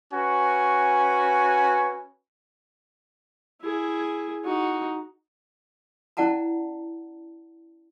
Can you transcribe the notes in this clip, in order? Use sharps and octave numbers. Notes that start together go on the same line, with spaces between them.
C#4 F#4 B4 G#5
E4 G#4
D#4 F#4
C#4 E4 D5 F#5 A5 A#5